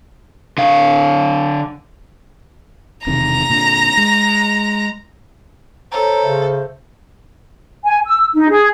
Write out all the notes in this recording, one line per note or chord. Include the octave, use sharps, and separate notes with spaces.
D3 F5
E1 C3 D#3 A#5 A#6
A#2 D3
G#3
A4 C5 C#5 A#5
C#3 E5
G#5
E6
D#4
G#4